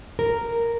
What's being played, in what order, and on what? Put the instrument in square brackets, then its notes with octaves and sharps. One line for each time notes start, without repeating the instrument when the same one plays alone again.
[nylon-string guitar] A#4